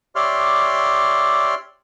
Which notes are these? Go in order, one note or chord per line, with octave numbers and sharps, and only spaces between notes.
G4 C#5 D5 E5 C6 F6